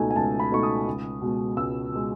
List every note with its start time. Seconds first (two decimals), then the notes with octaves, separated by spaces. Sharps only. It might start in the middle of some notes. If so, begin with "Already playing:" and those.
Already playing: C#2 B2 A3 D#4 G#5
0.11 G#5
0.16 C#2 A5
0.40 B5
0.52 B2 A3 D#4 C#6
0.63 D#6
0.87 C#2
1.22 B2 G#3
1.57 C#2 E6
1.93 B2 G#3